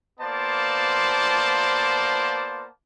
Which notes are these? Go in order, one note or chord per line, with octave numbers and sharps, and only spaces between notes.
A#3 B3 F4 C5 D5 A5